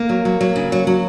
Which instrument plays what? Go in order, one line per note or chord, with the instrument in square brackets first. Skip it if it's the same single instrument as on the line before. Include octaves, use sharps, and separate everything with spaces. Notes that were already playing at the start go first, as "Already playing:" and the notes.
Already playing: [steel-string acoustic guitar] A#3
F#3
F#3
F#3
C#3
F#3
F#3